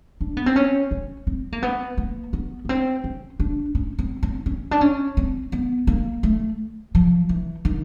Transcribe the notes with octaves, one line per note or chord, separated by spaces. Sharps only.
D4
B3
C4
C#4
C#4
C4
A#3
B3
A#3
B3
B3
C4
C#4
D4
C#4
C4
C4
C#4
D4
C#4
C4
B3
A#3
A3
F3
E3
D#3